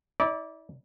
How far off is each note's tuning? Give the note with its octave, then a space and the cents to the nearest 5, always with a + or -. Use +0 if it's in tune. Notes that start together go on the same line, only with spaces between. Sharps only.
E4 -45 D5 -10